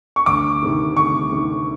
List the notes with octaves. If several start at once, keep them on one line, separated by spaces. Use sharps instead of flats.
C#6
D2 D6
C3 D#3
D2 C#6
C3 D#3